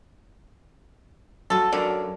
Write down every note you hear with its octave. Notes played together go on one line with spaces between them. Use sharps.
F#3 F4 F#4 A4
F#2 D3 A#4 D5